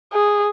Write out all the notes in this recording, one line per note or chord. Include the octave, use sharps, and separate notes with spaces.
G#4